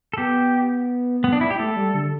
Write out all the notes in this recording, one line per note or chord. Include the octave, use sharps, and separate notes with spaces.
A4
B3 G4
B3
D4
E4
G4
A3 A4
G3
D3